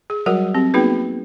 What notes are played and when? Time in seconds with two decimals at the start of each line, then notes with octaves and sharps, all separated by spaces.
0.10 G#4
0.26 F#3 G3 F#4 A#4 F#5
0.54 C4 G4
0.74 A#3 B3 D#4 F#4 G#4 B4